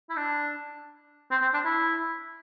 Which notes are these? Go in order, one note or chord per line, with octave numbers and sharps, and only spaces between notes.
E4
D4
C4
C4
D4
E4